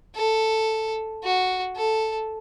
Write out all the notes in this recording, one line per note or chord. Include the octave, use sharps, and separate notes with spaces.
A4
F#4
A4